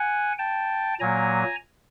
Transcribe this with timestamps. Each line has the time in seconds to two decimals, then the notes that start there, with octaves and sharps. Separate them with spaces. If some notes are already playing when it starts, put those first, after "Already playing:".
Already playing: F#5 G#5
0.38 G5 A5
1.00 A#2 F#3 A#3 G#5 A#5